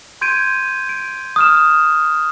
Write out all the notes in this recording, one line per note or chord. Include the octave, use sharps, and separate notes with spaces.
C6 G6 G#6 D7 D#7
D7
D#6 F6 E7